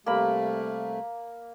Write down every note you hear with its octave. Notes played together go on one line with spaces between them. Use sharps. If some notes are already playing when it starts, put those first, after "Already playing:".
C3 G3 A3 A#3 B5